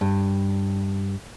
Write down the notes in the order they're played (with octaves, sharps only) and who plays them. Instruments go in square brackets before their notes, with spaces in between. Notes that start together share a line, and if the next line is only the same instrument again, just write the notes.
[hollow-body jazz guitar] G2